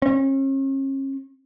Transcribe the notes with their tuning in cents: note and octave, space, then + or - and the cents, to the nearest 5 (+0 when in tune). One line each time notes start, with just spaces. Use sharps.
C#4 -40